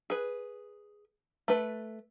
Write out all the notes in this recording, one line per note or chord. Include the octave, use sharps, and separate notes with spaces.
G#4 B4
A3 B4